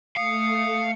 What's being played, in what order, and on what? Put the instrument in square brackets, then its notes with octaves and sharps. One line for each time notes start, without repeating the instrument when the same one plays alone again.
[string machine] A3 [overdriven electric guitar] F5 [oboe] D#6 [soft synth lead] C#7